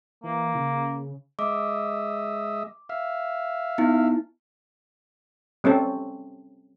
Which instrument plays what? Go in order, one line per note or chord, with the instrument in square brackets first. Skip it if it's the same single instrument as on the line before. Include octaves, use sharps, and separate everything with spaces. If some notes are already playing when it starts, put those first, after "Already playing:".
[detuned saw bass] E3 [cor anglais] A#3
[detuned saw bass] C#3
[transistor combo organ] G#3 D#5 E5 [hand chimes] D6
[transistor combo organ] E5 F5
[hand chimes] B3 D#4 E4
[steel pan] G3 C4 C#4 A4